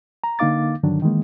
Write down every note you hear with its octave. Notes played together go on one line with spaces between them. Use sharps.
A#5
D3 A#3 D#4 F5 D6 A6
G2 D3 D#3 F#3 D4
D#3 E3 G#3 A#3